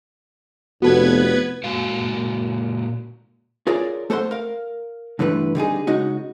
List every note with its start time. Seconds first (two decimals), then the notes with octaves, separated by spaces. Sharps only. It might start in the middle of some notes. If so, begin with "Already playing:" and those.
0.82 F1 B3 F#4 A4 B4 G#6
1.64 A#2 G#3 F#4 F5
3.67 F4 G#4 A#4 C#5 D5
4.10 A3 A4 C5 F#5 C6
4.31 A#4 F5
5.19 G2 D3 E3 A3 B4
5.55 D3 G3 D#4 G#4
5.87 C#3 G#3 D#4 F#4